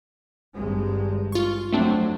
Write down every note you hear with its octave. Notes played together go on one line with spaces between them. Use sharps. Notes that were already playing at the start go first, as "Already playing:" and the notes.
G#1 G2 G#3
F4 C#6
F2 F#3 A3 C4 D4